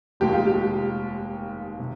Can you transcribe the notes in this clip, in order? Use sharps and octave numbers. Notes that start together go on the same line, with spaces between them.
F1 D#2 D#3 G#3 G4
F4
G4
C3